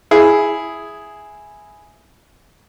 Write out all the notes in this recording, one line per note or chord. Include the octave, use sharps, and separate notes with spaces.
E4 G#4